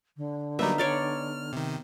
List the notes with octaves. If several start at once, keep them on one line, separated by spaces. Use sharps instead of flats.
D3
F#3 G3 A#3 B3 D#4 E5
C#5 D5 C6 F6
C3 D#3